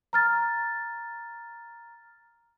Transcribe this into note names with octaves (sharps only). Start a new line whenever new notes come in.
A#5 F6 A6